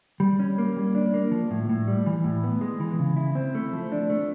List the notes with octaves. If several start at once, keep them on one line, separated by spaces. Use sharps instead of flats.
G3
C#4
A#3
G3
D4
A#3
F3
A2
A2
G3
E3
A2
B3
G#3
E3
C#3
E4
C4
A3
F3
D4
A3